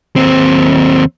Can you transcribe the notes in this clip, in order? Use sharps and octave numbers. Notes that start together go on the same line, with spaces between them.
D#2 C4